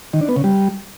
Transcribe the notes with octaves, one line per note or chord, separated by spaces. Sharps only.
D#3
D4
B3
C#3
G3